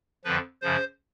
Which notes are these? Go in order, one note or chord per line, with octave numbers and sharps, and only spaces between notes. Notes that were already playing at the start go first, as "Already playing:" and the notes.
F2 D3 F3 B4
F#2 C#3 F3 C5